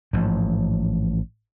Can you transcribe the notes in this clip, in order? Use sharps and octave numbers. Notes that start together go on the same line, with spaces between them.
A1 G#2 F3